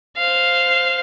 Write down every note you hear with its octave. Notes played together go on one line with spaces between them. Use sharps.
C5 F5